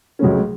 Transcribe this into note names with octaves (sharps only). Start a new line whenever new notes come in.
C#2 C#3 F#3 A3 C#4